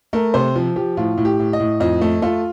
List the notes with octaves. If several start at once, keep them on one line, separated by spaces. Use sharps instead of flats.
A3 A#4
C3 C5
F3
F3 G4
A2 F4
A2
G4
A2
D#5
A2
F2 D#5
A3
A3 F4